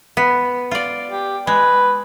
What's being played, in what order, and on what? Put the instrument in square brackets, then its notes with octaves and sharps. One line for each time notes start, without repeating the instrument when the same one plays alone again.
[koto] B3
F4 D5
[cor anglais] G4
[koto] G#3 [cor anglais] B4